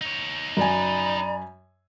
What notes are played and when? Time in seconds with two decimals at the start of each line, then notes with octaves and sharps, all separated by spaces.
0.01 D#4 C#5
0.57 F#2 D5 G#5 A#5 B5